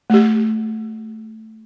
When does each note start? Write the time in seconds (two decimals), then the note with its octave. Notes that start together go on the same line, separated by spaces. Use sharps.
0.10 A3 G4